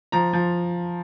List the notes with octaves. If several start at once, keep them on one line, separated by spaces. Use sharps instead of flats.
F3 A#5
F3